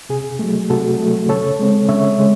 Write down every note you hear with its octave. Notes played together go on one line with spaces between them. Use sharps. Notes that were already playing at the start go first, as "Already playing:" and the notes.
C3 G#4
F#3 A3
C3 F#4 A4
F#3 A3
C#3 A4 C#5
G#3 C4
C#3 C#5 E5
G#3